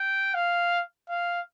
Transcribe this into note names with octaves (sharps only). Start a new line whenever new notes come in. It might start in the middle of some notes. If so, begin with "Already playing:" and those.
Already playing: G5
F5
F5